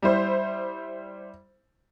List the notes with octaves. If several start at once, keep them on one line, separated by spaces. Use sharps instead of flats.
G3 E4 C5